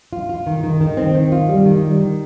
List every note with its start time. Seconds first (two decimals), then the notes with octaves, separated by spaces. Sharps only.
0.13 F4
0.29 F4
0.47 D#3
0.63 D#3
0.81 D#3
0.97 C4
1.15 D#3
1.32 F4
1.49 G3
1.66 D#3
1.83 G3
2.00 D#3